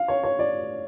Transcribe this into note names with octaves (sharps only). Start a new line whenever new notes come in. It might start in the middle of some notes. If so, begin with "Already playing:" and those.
Already playing: F5
C#5
C#5
D5